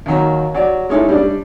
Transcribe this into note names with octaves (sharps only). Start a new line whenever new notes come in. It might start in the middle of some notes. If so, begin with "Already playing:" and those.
D#2 D#3 F#3 A#5
F#3 D5
G#3 C#4 D#4 E4 A4
G3 D4